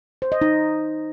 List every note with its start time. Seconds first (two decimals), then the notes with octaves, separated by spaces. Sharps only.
0.22 C5
0.32 D#5
0.42 D#4